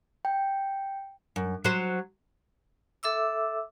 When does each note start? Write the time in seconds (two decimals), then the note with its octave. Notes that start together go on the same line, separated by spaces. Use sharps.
0.25 G5
1.36 F#2
1.64 F#3 C5
3.03 A4 E5 D6 E6